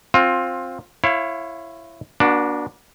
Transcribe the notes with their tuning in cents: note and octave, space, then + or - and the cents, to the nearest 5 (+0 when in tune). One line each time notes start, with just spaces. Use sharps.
C4 +10 F4 +20
E4 +20 C#5 -25 F5 +5
A#3 +45 D4 +0 F#4 +0